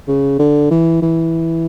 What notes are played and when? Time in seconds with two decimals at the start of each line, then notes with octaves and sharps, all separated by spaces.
0.08 C#3
0.39 D3
0.71 E3
1.02 E3